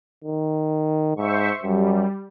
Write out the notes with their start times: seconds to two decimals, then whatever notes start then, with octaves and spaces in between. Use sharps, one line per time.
0.24 D#3
1.17 G#2 C5 E5 C#6
1.63 F#2 G3